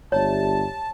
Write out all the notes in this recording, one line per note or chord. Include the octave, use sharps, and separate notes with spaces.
G1 G4 C#5 D5 E5 A5